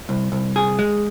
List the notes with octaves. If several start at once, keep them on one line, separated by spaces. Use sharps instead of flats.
C2
C2
G#4
G#3